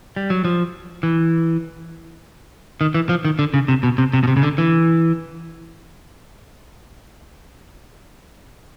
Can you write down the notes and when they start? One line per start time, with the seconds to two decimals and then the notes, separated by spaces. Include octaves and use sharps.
0.16 G3
0.30 F#3
0.45 F3
1.03 E3
2.81 D#3
2.94 E3
3.09 F3
3.25 D#3
3.39 D3
3.54 C#3
3.68 C3
3.83 B2
3.98 C3
4.13 C3
4.23 B2
4.28 C3
4.37 C#3
4.43 D3
4.58 E3